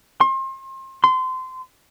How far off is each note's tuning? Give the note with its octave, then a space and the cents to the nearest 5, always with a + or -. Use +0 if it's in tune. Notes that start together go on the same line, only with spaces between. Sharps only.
C6 +35
C6 -25